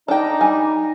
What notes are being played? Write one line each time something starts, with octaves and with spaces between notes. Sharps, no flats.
D4 D#4 G5
G3 G#5